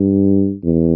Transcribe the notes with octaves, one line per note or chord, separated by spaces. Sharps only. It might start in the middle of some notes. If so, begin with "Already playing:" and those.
Already playing: G2
E2